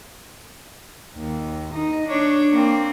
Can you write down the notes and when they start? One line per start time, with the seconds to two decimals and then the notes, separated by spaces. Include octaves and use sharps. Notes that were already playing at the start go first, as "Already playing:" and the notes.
1.16 D#2
1.73 D#4
2.09 D4 C#5
2.52 A#3 C4